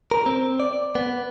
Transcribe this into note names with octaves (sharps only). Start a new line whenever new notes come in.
A#4
C4
D5
B3